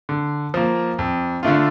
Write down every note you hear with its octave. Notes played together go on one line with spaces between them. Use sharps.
D3
F3 A#3
F2
D3 A3 D4 F4